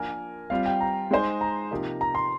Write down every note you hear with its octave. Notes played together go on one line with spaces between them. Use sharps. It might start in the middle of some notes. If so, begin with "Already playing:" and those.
Already playing: F3 A#3 D4 F4 A#4 G#5
G3 C4 F4 F5
G5
A#5
G#3 D#4 G#4 C5
A#5
C3 F3 A#3 D#4 G4
A#5
C6